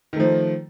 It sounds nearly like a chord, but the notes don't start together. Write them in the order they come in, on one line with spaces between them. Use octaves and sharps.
D#3 A3 F3